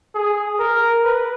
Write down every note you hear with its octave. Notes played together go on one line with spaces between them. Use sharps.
G#4
A#4
B4